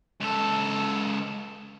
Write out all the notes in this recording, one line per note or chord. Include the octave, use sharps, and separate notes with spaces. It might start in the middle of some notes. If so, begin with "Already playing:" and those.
C#2 A4